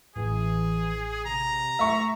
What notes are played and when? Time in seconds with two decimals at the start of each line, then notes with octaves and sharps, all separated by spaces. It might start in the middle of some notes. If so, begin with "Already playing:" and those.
0.16 A1 E3 G#4
1.25 C3 A#5
1.79 A3 E5 C#6